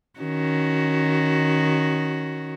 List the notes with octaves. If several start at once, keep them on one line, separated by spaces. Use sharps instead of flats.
D#3 C#4 F#4